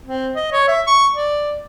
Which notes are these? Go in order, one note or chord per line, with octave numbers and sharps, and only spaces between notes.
C4
D#5
C#5
E5
C#6
D5